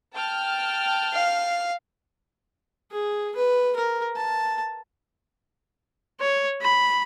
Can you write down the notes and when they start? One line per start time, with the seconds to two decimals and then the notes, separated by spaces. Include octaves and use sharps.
0.15 G5 A5 F6
1.13 F5
2.92 G#4
3.36 B4
3.76 A#4
4.16 A5
6.20 C#5
6.62 B5